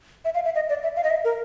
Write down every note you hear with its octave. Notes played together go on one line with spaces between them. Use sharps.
E5
F5
E5
D#5
D5
E5
F5
D#5
E5
A#4